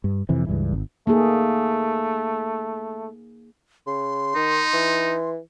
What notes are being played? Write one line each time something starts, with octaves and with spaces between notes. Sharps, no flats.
G2
F2 C3 E3
C#2 G2 E3
G#1
A3 A#3 D#4 G#4
C#3 C6
D#3 D#4
E3